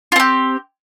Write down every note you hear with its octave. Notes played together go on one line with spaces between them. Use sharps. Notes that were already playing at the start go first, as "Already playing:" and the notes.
C4 F4 G4